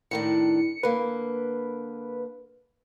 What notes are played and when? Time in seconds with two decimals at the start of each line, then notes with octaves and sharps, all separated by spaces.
0.11 A2 D#3 D4 C#7
0.83 D3 A#3 B4